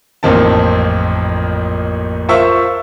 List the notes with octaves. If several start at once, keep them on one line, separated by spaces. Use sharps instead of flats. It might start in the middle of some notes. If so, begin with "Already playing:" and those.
A1 F2 A#2 D#3 C4 A5
F4 A#4 C5 E5 C#6 E6